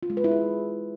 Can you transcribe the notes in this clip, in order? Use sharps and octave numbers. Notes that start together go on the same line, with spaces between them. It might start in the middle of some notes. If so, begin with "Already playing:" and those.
F4
G#3
B4
E4
G#4